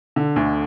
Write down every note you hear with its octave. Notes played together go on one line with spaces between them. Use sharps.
D3
D2